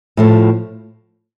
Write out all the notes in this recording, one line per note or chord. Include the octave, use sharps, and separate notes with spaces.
A2 F3 A3